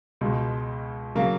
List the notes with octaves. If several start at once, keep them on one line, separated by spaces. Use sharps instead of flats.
C#2 B2 G#3
C#3 F#3 A#3